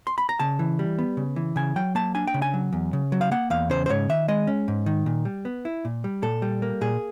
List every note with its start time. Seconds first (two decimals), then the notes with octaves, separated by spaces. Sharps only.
0.07 C6
0.18 B5
0.29 A#5
0.39 C#3 A5
0.59 E3
0.79 G3
0.99 B3
1.17 C#3
1.36 E3
1.56 C#3 G#5
1.76 F#3 G5
1.95 A#3 A5
2.15 D4 G#5
2.27 G5
2.34 C#3
2.42 G#5
2.54 F#3
2.73 E2
2.93 C#3
3.12 F#3
3.21 F5
3.31 A#3 F#5
3.50 E2 F5
3.70 C#3 C5
3.86 C5
3.89 G#2 C#5
4.09 D#3 E5
4.28 G#3 D#5
4.47 C#4
4.68 G#2
4.86 D#3
5.06 A#2
5.25 G3
5.45 B3
5.65 E4
5.85 A#2
6.04 G3
6.23 A#2 A4
6.42 G3
6.62 A#3
6.81 A#2 G#4